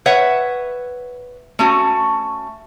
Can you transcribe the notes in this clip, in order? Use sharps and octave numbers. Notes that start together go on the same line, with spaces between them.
B4 C#5 E5 F#5
A3 C#4 F#4